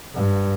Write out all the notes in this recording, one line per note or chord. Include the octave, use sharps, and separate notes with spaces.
G2